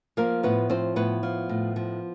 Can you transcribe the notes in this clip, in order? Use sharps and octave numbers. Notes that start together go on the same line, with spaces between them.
F3 A#3 A#4
A2 B3 B4
F3 C4 C5
A2 B3 B4
F3
A2
F3